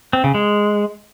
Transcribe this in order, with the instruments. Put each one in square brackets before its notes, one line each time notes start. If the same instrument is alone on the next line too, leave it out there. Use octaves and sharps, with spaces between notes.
[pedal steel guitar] C4
C#3
G#3